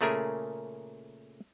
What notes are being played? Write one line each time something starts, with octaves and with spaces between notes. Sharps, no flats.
A#2 C#3 A3 G#4 A#4 G#5